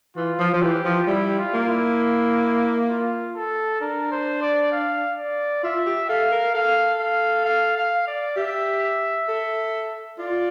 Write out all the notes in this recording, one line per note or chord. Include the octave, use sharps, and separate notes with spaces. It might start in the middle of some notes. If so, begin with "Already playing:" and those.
E3 F4
F3
F3
E3 G4
F3
G3 E4
F4
A#3
E4
F4
A4
D4 A#4
C5
D5
F5
D5
F4 E5
G4
A4 F5
A#4
A4 F5
F5
F5
F5
D5
G4 E5
A4
F4 D5